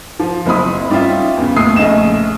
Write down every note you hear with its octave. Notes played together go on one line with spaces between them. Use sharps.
F3
F#1 C4 E4 B5 D#6
G3 C#4 D#4 F4 E5
E2 C#3
D#2 A2 D#6 C7
A#1 A2 C#3 D#5 E7